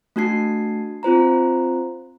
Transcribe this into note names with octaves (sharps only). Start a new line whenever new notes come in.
A3 D4 F#4 A5 G#6 C7
C4 F4 C5 A#5